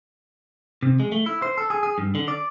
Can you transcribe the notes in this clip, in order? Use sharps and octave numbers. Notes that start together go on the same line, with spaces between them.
C3
G#3
A3
E4
C5
A4
G#4
G#4
G2
D3
D5